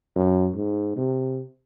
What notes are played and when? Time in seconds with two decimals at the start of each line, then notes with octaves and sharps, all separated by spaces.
0.16 F#2
0.55 G#2
0.97 C3